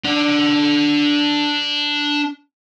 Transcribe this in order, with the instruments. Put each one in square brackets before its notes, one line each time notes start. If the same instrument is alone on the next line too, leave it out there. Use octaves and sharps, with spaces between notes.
[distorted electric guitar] D4 F#5